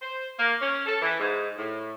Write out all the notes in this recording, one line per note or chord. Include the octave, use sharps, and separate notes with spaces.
C5
A#3
C#4
A4
E3
G#2
A2